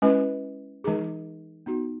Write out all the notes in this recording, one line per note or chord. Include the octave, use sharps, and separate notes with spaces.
G#3 C#4 E4 B4
E3 G#3 D#4 G#4
B3 D#4 F#4